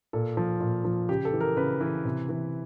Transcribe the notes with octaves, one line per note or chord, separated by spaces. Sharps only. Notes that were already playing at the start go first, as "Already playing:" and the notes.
A#2 A4
F3
A#2
F3
C#3 G4
A4
E3
A#4
C#3 B4
E3
C3
E3